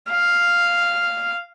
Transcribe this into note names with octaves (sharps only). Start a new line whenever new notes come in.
F5